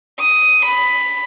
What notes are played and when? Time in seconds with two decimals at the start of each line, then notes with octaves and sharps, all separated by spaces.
0.19 D#6
0.65 B5